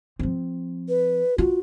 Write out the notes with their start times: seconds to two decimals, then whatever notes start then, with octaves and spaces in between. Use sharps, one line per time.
0.19 F3 C4
0.89 B4
1.38 F4 F#4